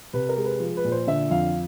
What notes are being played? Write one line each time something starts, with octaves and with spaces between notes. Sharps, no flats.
C3 B4
A#4
G#3
B4
F3
B4
A#2
C5
D3 E5
F2 F5